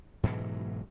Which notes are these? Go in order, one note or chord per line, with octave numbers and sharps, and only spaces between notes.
G#2 B2 E3 F#3